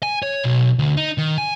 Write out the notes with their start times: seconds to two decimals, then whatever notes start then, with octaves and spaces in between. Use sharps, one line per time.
0.03 G#5
0.22 C#5
0.44 B1
0.79 D2
0.97 D#4
1.18 D#3
1.38 G#5